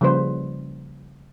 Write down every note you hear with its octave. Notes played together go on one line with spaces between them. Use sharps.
C#3 F3 G3 A#3 B4 C5